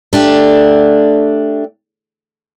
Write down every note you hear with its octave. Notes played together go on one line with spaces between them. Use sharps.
A3 D4 G4